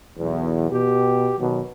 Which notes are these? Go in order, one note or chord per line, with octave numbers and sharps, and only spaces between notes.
B1 E2
B2 G4
B2 D#3 F#3